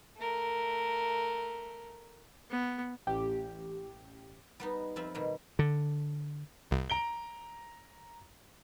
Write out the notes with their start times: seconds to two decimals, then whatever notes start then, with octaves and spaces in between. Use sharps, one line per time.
0.17 A3 A#4
2.51 B3
3.07 A1 G4
4.60 G3 B3 D#4
4.96 F2 C4 F4 E5 B5
5.15 B2 D#3 G3
5.59 D3
6.71 C2
6.90 A#5 D7 G7